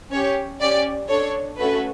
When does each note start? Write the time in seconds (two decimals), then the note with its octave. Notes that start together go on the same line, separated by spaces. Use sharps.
0.11 C#4 G4 C#5
0.60 C#4 G4 D5
1.09 D4 A4 C#5
1.58 A3 C#4 F#4 A4 B4